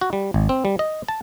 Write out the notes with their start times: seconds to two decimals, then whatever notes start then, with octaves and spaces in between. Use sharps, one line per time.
0.01 F#4
0.13 G3
0.34 G#1
0.49 C4
0.65 G3
0.79 D#5
1.08 A5